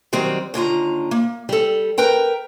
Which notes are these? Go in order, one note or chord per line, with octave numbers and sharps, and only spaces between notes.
D#3 F#3 G3 C4
D#2 D3 F4 A#5
A#3
G3 A4
A#4 B4 G5 A#5